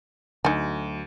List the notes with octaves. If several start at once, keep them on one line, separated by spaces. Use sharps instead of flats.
D2 D3 F#3 D#4 G#5